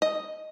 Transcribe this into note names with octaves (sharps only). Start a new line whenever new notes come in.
D#5